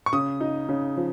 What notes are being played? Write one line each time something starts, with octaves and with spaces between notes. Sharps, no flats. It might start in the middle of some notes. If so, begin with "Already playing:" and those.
C#6
C#3 D#6
D#4
C#3
F3